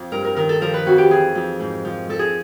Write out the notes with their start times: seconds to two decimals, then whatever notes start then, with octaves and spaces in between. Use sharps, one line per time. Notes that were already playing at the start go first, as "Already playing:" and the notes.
Already playing: F2
0.12 G2 A#4
0.25 A#4
0.36 D#3 A#4
0.49 A4
0.61 F3 A#4
0.74 B4
0.86 F2 F#4
0.98 G4
1.10 E3 G#4
1.35 F2
1.60 G#2
1.85 F3
2.09 F3 A4
2.19 G#4